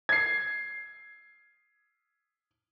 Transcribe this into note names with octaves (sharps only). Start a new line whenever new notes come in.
G#6 C7